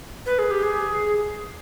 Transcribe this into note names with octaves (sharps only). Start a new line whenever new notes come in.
B4
G#4
G4
G#4